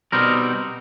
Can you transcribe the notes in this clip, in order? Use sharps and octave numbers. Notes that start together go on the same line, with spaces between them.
B2 G3 C4 D#4 A#4